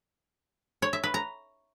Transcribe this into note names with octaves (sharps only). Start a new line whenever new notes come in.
C#5
E5
B4
A#5